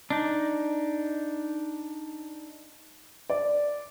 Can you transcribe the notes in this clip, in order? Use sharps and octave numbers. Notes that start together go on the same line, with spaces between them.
D4 D#4
D5